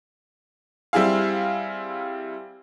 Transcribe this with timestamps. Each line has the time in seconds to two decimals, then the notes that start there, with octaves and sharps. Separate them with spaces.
0.93 G3 C4 E4 G#4 F5